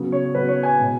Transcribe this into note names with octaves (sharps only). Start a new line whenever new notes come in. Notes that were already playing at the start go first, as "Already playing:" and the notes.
Already playing: C#3 F#3 B3
C#5
C#3 F#3 B3 B4
C#5
G#5
B2 G#3 B3